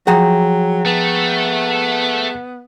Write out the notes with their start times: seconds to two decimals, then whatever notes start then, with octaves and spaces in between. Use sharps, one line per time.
0.07 F3 F#3 G#4 F#5 G5 A#5
0.85 A3 B3